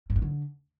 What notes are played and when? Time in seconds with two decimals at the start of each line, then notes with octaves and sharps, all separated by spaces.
0.10 G#2
0.16 G2
0.22 D3